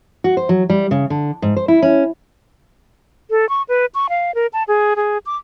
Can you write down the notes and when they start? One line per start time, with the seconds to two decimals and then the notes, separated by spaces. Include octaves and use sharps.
0.24 F#4
0.37 C5
0.49 F#3
0.70 G3
0.91 C#3
1.10 D3
1.42 G#2
1.57 C5
1.68 E4
1.82 C#4
3.30 A4
3.49 C#6
3.69 B4
3.95 C#6
4.09 F5
4.35 A#4
4.53 A5
4.68 G#4
4.96 G#4
5.26 D6